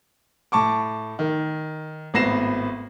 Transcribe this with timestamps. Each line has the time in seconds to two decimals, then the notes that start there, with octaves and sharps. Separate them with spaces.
0.52 A2 A5 C#6 D6
1.19 D#3
2.14 G#1 A2 B3 A#6 C7 E7